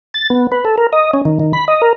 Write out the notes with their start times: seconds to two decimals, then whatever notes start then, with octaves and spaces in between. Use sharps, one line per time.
0.14 A6
0.30 B3
0.52 B4
0.65 A4
0.78 A#4
0.93 D#5
1.14 C#4
1.25 D#3
1.40 D#3
1.53 B5
1.68 D#5
1.82 A#4